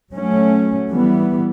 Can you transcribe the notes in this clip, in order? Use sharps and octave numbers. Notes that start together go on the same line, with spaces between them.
F#3 A3 C#4
E3 G3 B3